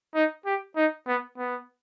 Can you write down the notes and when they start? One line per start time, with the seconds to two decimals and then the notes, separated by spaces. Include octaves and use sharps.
0.14 D#4
0.45 G4
0.76 D#4
1.07 B3
1.38 B3